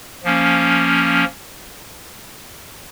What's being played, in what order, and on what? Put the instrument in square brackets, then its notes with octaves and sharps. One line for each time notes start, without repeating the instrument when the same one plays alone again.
[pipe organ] F3 A#3 C#4